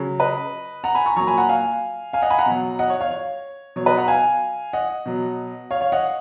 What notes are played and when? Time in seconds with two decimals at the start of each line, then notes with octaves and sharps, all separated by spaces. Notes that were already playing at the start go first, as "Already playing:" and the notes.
Already playing: C#3 F#3
0.20 B4 D#5
0.84 F#5 A#5
0.95 G#5 B5
1.06 A#5 C#6
1.16 A#2 F#3 A#5 C#6
1.27 G#5 B5
1.38 F#5 A#5
1.49 F5 G#5
2.13 F5 G#5
2.22 D#5 F#5
2.30 G#5 B5
2.39 F#5 A#5
2.46 B2 F#3
2.79 D#5 F#5
2.90 C#5
3.01 C#5 F5
3.11 C#5
3.76 B2 F#3 C#5
3.86 B4 D#5
3.97 F#5 A#5
4.08 F5 G#5
4.73 D#5 F#5
5.06 B2 F#3
5.71 C#5 F5
5.81 C#5 F5
5.92 D#5 F#5